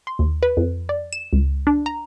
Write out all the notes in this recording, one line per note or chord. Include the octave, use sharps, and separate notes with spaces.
C6
D#2
B4
F2
D5
E7
C#2
D4
A#5